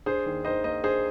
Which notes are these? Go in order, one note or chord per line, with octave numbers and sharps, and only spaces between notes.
D4 G#4 C5
D#2
D#3 C5 D#5
A#3 C5 D#5
D4 G#4 C5